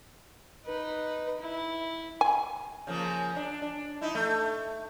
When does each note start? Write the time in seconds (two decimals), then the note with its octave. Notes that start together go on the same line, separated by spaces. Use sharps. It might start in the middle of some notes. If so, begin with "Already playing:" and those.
0.66 D#4 B4
1.40 E4
2.21 G#5
2.87 C#3 F3 A#3
3.36 D4
3.62 D4
4.01 D#4 E4
4.15 A3